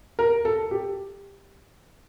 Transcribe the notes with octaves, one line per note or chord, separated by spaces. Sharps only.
A#4
A4
G4